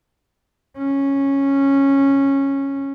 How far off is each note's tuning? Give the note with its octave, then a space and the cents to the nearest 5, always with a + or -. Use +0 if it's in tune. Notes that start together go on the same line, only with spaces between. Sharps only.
C#4 -10